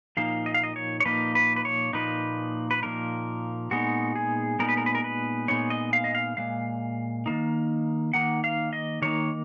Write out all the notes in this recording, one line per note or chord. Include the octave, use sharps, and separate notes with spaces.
A#2 F3 A#3 D#4 F5
D#5
F5
D#5
C#5
C#5
A#2 F3 A#3 D#4 B4
B4
B4
C#5
A#2 F3 A#3 D#4 B4
B4
A#2 F3 A#3 D#4 A#4
A#2 G#3 B3 D#4 F#4
G#4
A#2 G#3 B3 D#4 A#4
B4
A#4
B4
A#4
B4
A#2 G#3 B3 D#4 C#5
D#5
F5
D#5
F5
A#2 G#3 F5
D#3 A#3 D#4
D#3 A#3 D#4 F#5
F5
D#5
D#3 A#3 D#4 C#5